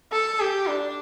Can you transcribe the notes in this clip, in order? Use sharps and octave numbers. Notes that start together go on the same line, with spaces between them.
A4
G4
D4